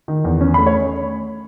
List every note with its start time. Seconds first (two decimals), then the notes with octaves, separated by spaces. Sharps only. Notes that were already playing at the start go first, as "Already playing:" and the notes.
0.08 D#3
0.24 E2
0.41 C#4
0.54 B5
0.58 A3
0.66 C#5